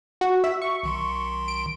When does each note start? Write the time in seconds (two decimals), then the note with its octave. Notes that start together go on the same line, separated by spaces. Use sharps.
0.21 F#4
0.44 E5
0.62 C#6
0.83 B1 D#3 C6
1.48 D7